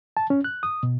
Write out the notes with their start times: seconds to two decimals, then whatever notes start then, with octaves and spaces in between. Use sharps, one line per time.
0.17 A5
0.30 C#4
0.44 F#6
0.63 D#6
0.83 B2